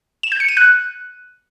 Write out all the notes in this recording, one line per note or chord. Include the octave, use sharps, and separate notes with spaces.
E7
G6
C#7
D#7
F#6